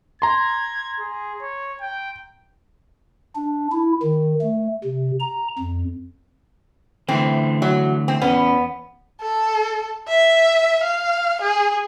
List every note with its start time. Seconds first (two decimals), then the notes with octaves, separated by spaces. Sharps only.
0.22 A#5 C6 G#6
1.00 G#4
1.42 C#5
1.81 G5
3.35 D4
3.72 E4
4.03 D#3
4.41 A3
4.84 C3
5.20 A#5
5.59 F2
7.08 D3 E3 A3 C4
7.62 F#3
8.08 C4
8.22 E2 B3 C#4
9.21 A4
10.08 E5
10.83 F5
11.41 G#4